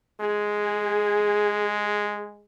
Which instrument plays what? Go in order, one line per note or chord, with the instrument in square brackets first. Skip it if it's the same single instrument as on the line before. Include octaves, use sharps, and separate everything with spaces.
[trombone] G#3 [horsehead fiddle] G#4